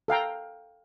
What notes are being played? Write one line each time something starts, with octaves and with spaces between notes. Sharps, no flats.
A4 F5 G5 A#5